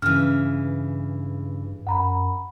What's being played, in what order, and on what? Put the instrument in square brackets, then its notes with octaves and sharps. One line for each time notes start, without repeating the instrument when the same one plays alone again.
[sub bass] G2 [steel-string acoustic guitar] C#3 E3 [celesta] F6
[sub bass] F#2 [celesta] F#5 A#5 B5